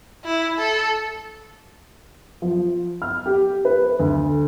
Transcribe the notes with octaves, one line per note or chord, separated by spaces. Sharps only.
E4
A4
F3
F6
G4
B4
D2